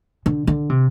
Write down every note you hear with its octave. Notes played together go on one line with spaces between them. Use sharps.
D3
D3
C3